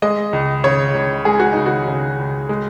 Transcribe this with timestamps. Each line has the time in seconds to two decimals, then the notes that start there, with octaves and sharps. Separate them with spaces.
0.02 G#3 D#5
0.33 C#2
0.64 C#3 C#5
0.95 C#2
1.25 G#3 G#4
1.40 F#4
1.53 C#2 D#4
1.66 F#4
1.88 C#3
2.18 C#2
2.49 G#3